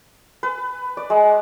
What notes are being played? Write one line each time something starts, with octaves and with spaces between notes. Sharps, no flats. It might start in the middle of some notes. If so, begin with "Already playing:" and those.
B4
D5
G#3